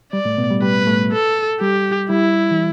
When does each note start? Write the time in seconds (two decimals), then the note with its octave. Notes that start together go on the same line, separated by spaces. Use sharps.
0.13 G3 D5
0.25 A2 A3
0.37 B2 B3
0.50 G3
0.62 G3 B4
0.87 A2 A3
1.12 A4
1.60 G3 G4
2.10 G3 E4
2.51 E3